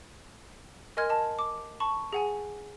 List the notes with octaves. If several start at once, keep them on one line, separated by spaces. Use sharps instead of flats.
A#4 D#5 G#5 C6 F6 G#6
D#5 A5
D6
A5 B5 C#6
G#4 F#5 G#5